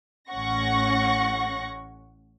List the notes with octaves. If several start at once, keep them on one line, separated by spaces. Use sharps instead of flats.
A1 A2 C#4 F#5 C#6 A#6